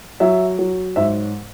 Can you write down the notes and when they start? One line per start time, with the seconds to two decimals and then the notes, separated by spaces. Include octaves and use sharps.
0.20 F#3 E5
0.59 F#3
0.96 G#2 E5